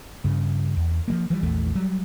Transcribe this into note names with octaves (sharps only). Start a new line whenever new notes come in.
G2 C#3
E2
F3 G3 A#3
E3 F3 G3
A#1 E2 E3 A3
F#3 G3